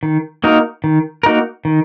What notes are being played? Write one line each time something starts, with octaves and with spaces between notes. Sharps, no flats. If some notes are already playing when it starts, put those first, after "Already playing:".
D#3
A#3 D#4 F#4 A#4
D#3
A#3 D#4 F#4 A#4
D#3